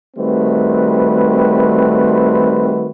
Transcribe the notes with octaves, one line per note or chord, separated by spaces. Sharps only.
D#3 G3 A3 C4 F#4 B4